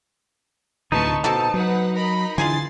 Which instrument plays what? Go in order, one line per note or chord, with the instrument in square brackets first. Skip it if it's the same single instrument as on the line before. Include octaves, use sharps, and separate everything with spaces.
[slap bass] D2 A2 C3 [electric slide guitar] D#4 [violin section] B4 A5 C#6
[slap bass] B2 [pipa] C4 F#4 A4 [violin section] A5
[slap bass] F#3 [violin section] B4 F#5
[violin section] A#4 D#5 B5
[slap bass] D3 E3 [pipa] F4 G#4 G#5 [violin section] C6 A6 C7